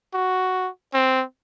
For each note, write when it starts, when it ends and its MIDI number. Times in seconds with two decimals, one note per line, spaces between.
0.14 0.69 66
0.94 1.24 60